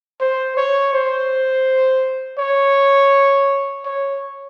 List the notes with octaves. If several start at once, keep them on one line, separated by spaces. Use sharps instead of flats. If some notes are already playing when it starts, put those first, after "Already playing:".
C5
C#5
C5
C#5
C#5